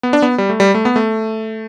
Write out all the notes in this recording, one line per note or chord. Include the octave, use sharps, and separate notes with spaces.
B3
D4
B3
G3
A3
G3
A3
B3
A3